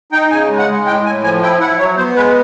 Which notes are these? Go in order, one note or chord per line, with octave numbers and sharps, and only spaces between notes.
D#4 G5
C#3 G#5
G#3
F#5
G#3
A2 G5
A2 G#5
F3 G#5
E4 G5
E4 F#5
F#3 C#5
B3 C5
G#3 B4